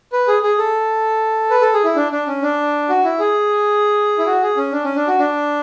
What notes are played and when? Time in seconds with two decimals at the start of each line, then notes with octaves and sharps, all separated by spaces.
0.13 B4
0.28 G#4
0.43 G#4
0.59 A4
1.50 B4
1.62 A4
1.74 G#4
1.84 E4
1.96 D4
2.12 D4
2.27 C#4
2.43 D4
2.89 F#4
3.04 E4
3.19 G#4
4.19 E4
4.26 F#4
4.42 G#4
4.57 C#4
4.72 D4
4.84 C#4
4.96 D4
5.08 F#4
5.19 D4